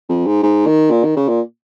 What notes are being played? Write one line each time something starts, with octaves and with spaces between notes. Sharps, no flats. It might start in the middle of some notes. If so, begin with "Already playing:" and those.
F2
G#2
G#2
D#3
A#2
D#3
C#3
A#2